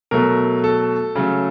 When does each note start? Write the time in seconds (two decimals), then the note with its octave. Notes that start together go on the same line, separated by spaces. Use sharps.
0.11 B2 F#3 A3 A#4
0.64 A4
1.16 C#3 F#3 A3